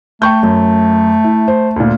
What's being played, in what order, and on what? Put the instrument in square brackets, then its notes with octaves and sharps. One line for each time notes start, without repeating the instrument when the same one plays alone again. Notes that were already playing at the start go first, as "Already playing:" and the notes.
[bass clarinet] A3 [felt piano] G5 C#6 G6
[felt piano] F#2
E4
C5
D2 A#2